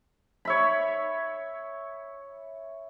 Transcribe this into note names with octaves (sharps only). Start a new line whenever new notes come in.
C#5 E5 B5